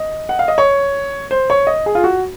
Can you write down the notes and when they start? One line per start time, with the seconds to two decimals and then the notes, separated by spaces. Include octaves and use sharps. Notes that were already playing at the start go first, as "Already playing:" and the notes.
Already playing: D#5
0.29 F#5
0.39 F5
0.48 D#5
0.58 C#5
1.31 C5
1.50 C#5
1.67 D#5
1.86 G#4
1.95 F4
2.04 F#4